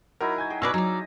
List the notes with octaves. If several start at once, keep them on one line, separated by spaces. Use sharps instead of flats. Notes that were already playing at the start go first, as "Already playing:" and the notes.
F#3 D#4 E4 A#4
G#5 G6 G#6
G#4 G5
B2 B4 D5 C#6 E6 F6 A#6
F#3 D#4 D5